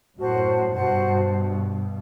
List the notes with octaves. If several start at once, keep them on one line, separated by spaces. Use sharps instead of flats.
F#2 A2 F#4 C5 F#5 A5
G2 B2 F#4 C5 F#5 A5